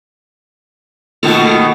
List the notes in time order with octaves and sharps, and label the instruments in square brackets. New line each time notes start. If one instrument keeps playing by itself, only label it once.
[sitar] B2 D#3 A4 [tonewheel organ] A3 A#3 F4